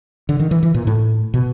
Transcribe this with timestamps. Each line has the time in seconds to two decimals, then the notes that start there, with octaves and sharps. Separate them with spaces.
0.29 D3
0.40 D#3
0.51 E3
0.63 E3
0.74 A#2
0.87 A2
1.34 B2